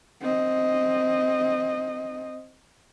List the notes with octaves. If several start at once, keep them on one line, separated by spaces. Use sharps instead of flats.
C4 D#5